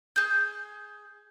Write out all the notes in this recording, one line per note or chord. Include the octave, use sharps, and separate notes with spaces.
G#4 G6